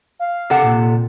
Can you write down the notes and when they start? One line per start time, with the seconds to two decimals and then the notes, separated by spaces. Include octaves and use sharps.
0.19 F5
0.50 C3 A4 F#5
0.63 A#2